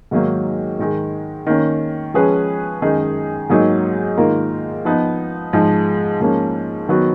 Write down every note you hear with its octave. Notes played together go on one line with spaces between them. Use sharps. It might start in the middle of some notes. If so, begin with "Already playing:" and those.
G#2 D#3 F#3 A#3
G#2 D#3 G#3
D#3 A#3 C#4
F3 G#3 C#4 G#4 B4
F#2 D#3 G#3 D#4 G#4
G#2 F#3 A#3 D#4 G#4
G#2 D#3 A#3 F4 A#4
F3 B3 D#4
G#2 F3 G#3
G#2 F3 A#3 C#4
D#3 F#3 B3 F#4